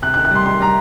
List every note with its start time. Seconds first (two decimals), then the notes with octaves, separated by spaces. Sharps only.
0.02 C3 F#6
0.14 F#6
0.17 D#3
0.25 F#6
0.31 G3 C6
0.46 D#3 C6
0.60 G3 A#5